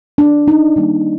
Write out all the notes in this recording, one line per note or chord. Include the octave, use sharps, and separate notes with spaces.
D4
D#4
D#3 G3 A#3